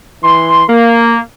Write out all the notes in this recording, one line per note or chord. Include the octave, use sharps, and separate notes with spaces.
E3 C6
A#3